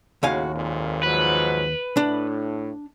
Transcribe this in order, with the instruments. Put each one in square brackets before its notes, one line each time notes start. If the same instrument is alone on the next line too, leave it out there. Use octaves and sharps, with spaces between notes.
[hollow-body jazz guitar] D#2 F5 G#5 [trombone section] A2 C#3 F#4
[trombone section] G#1 F2 A#2
[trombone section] G#2 F3 F#3 [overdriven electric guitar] B4
[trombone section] A2 [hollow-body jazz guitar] D4